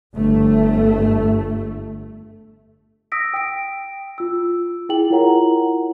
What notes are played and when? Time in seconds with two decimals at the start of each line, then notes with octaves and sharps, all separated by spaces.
0.14 G1 A3
3.12 D#6 E6 A#6 B6 D7
3.34 G5 D7
4.18 F4 E6
4.89 E4 G#4 G5 F#7
5.10 E4 F4 A#4 C#5 F#5 A#5